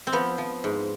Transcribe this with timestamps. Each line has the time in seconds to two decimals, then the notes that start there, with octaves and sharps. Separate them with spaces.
0.07 C4
0.12 F3 B3
0.38 F3
0.64 G#2